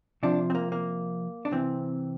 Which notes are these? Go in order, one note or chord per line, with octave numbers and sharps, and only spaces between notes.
C3 F3 D4
C4
A#3
A#3
D4
C3 E3 C4